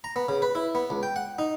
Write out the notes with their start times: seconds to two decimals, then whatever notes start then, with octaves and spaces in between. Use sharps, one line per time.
0.04 A#5
0.16 B3
0.29 C#3
0.42 B4
0.55 E4
0.75 B3
0.90 C#2
1.03 G5
1.16 F#5
1.39 D#4